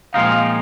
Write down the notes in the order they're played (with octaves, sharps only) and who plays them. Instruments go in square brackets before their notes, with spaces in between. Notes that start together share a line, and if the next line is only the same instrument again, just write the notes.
[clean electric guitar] A#2 F3 G#3 C4 D#4 [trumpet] F5